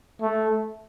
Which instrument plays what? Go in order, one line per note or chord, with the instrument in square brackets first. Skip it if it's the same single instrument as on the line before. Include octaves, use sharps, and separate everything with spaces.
[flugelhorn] A3